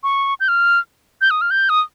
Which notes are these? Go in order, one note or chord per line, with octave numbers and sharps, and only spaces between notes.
C#6
G6
F6
G6
D#6
F6
G6
D#6